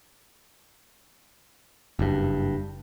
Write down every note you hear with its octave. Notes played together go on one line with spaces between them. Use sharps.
F#1 G2